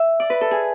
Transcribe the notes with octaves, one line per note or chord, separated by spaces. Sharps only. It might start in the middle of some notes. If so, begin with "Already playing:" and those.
Already playing: E5
D5
B4
A4
G#4